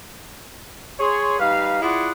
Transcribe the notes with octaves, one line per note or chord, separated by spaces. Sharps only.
G#4 C#5 C6
G3 D#4 B4 F5
E4 F4 G#4 D5 F#5